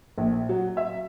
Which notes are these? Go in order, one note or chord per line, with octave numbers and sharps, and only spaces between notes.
A#1
F#3
E5